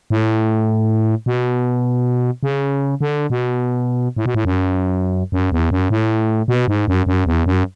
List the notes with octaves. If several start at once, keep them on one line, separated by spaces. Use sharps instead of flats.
A2
B2
C#3
D3
B2
A2
B2
A2
F#2
F#2
E2
F#2
A2
B2
G#2
F#2
F#2
E2
F#2